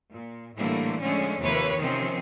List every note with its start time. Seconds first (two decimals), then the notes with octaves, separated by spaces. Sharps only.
0.13 A#2
0.56 A2 D3 E3 G3 A3 A#3
1.01 D3 F3 G#3 A3 C#4
1.39 D#2 C3 F3 A#3 B4 C#5
1.77 C3 D#3 F3 C4 C#4